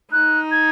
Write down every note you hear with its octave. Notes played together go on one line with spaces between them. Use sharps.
D#4 F#6
G#6